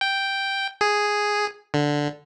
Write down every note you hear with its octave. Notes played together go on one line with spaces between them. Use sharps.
G5
G#4
D3